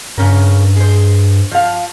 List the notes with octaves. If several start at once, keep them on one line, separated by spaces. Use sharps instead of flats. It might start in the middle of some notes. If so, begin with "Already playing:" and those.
G2 C#3 C#4 A#4
G#4 C5
F3 F5